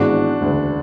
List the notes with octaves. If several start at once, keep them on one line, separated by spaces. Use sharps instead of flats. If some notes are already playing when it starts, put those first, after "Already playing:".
Already playing: G#1 G#2 E3 G#3 B3 D4 F#4
E1 D2 C#3